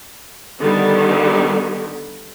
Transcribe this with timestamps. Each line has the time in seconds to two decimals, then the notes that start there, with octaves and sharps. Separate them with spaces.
0.59 D3 D#3 G3 B3